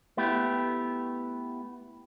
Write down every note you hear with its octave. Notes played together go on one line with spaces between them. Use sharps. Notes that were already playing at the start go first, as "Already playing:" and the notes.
A3 B3 E4 G4